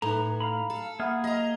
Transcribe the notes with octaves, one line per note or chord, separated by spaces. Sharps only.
A2 D#4 A4 B4 A#5
F5 A#5 B5
A4
A#3 G#4 E5 F#5 B5 F6
D#5 A#5